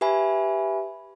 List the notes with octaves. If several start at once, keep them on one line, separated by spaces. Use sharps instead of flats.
G4 B4 E5 G#5 B5